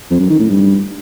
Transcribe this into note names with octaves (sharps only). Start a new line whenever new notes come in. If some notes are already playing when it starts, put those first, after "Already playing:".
F2
F#2
D#3
A2
G2